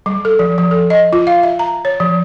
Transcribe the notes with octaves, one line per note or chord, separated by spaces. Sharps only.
G3
A4
F3
F3
A4
D#5
F4
F5
E5
A#5
C#5
F3